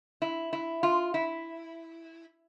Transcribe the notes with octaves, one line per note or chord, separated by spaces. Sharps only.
E4
E4
F4
E4